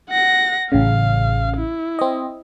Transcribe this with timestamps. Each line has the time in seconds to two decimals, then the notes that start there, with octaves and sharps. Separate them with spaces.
0.10 F#5 A#6
0.72 A1 C#3 F5
1.57 E4
1.99 C4 D#5